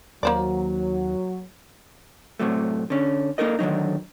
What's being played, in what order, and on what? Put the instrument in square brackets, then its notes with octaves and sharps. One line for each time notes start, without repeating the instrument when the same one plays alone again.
[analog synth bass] D#2 [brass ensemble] F#3 [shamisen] A#3 C5 D5
[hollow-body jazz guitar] A2 C3 F#3 A3
D3 C#4
A#3 D#4 A4 A#4 D#5
D3 D#3 F#3 D#4